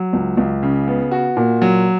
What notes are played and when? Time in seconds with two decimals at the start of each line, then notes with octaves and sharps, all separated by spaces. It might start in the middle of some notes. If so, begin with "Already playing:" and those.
Already playing: F#3
0.13 C#2
0.37 C#2
0.63 C#3
0.87 B3
1.11 F#4
1.37 A#2
1.62 F#3